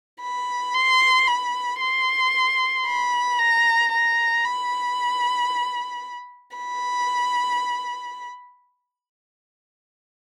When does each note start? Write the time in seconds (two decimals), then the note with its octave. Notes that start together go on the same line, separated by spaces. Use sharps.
0.21 B5
0.74 C6
1.27 B5
1.80 C6
2.85 B5
3.39 A#5
3.92 A#5
4.45 B5
6.57 B5